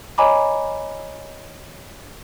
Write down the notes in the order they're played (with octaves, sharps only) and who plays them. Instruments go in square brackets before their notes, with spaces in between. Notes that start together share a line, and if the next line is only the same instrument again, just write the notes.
[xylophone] C#5 D#5 G#5 A#5 B5 D6